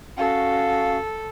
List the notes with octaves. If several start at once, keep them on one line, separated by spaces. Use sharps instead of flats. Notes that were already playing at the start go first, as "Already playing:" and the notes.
C#4 F#4 A4 F5